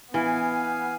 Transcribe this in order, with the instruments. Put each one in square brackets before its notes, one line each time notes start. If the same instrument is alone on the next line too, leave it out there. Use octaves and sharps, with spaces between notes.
[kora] E3 [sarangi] B3 [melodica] F5 G#5